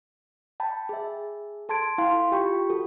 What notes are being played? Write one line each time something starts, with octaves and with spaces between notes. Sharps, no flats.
G5 A5 B5
G#4 E5
A4 A5 C6 G#6 D7
E4 F5 G5 C6
F4 G4 G5 B5 C#6
F#4 A4